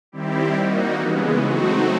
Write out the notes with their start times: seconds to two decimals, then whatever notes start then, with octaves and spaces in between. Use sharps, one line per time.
0.12 D#3 G3 C4 E4 G4
0.55 G3 A#3 D#4 F#4
0.98 C#3 E3 G#3 B3
1.41 F#3 A3 C4 D#4 F#4